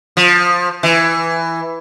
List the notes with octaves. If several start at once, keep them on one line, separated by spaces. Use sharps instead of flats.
F3
E3